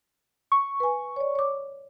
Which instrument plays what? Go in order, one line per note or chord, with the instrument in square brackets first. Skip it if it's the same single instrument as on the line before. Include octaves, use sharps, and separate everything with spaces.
[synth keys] C#6
[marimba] B4 G#5
C#5 D5
C#5 D6